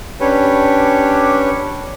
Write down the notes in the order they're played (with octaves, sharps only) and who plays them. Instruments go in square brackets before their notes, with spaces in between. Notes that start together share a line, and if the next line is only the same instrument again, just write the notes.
[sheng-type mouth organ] C#4 D4 G4 B4 C#5